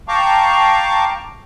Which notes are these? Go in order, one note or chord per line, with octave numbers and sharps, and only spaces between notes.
F5 G5 A5 A#5 C#6 D6